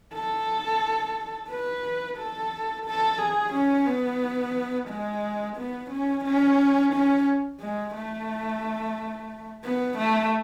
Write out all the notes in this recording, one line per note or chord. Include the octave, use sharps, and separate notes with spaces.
A4
B4
A4
A4
G#4
C#4
B3
G#3
B3
C#4
C#4
C#4
G#3
A3
B3
A3